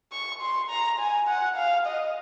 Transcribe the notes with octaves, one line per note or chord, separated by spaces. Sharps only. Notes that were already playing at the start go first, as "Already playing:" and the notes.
C#6
C6
A#5
G#5
F#5
F5
D#5